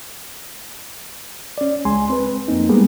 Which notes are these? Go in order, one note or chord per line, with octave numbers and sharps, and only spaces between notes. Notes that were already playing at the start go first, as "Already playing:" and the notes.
C#4 D5
C#2 G#3 G#5 C6
C4 B4
F2 A#3 C4 D#4
G3 G#3 A#3 B3 G#4